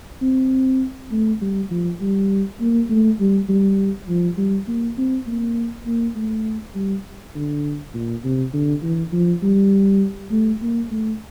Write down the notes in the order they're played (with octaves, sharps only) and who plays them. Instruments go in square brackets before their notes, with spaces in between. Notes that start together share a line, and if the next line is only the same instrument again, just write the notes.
[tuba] C4
A3
G3
F3
G3
A#3
A3
G3
G3
F3
G3
A#3
C4
A#3
A#3
A3
G3
D3
A#2
C3
D3
E3
F3
G3
A3
A#3
A3